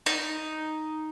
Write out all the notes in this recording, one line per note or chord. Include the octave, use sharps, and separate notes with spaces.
D#4